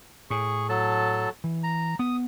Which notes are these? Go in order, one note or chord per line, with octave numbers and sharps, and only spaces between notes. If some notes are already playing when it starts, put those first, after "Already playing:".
A2 G#4 C#6
F#3 A4 A5
E3
A#5
B3 D#6